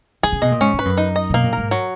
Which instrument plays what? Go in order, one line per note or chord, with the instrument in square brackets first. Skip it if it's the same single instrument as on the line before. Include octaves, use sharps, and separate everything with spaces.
[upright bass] D#3 [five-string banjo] G#4
[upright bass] C#3
[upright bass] B2 [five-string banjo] D#5
[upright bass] A#2
[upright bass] G#2 [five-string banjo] C#4
[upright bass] G#2
[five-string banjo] B4
[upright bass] F#2
[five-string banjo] D#4
D#5
[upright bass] B2 [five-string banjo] A#3
[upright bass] A#2
[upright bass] G#2 [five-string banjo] A#4
[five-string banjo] F#3